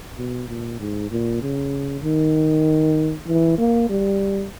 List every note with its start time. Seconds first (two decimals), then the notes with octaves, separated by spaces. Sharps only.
0.17 B2
0.48 A#2
0.80 G#2
1.11 A#2
1.42 C#3
2.03 D#3
3.28 E3
3.58 A#3
3.89 G3